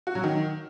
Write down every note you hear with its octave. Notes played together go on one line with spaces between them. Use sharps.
F#4
F#3
D#3